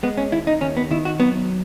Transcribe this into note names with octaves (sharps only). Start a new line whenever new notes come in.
G#3 B3
C#4
D#2 E4
D#4
D#2 C#4
B3
D#3 E4
F#4
F#3 B3